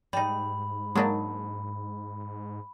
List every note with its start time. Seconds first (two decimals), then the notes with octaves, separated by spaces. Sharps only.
0.13 G#2 G3 D#4 B5
0.95 F#3 G#3 A#3 D4 D#4